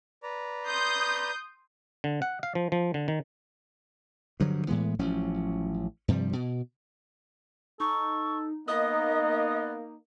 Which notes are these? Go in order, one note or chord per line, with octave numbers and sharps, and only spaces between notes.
B4 D5 A#5
C6 D#6 G6
D3
F#5
F5
F3
F3
D3
D#3
G2 D3 F3 F#3
A2 E3 G#3 B3
A1 F3 F#3 C#4
G2 C3 F3 G3
B2
D#4 A4 C#6
A#3 B3 D#4 D#5 D#6